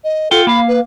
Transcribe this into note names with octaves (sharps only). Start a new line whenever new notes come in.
D#5
F4 A4 F#5 G5
A#3 F5 B5
B4